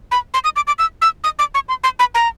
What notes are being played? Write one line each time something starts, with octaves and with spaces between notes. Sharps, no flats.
B5
C6
D#6
D6
D6
E6
E6
D#6
D6
C#6
C6
C6
B5
A#5